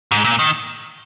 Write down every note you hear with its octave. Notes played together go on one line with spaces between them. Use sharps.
G#2
A#2
D#3